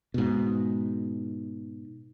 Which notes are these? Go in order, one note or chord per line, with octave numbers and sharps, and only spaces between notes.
G#2 B2